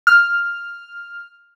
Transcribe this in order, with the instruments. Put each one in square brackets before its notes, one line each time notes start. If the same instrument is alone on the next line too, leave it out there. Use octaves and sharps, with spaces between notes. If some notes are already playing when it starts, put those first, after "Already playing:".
[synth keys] F6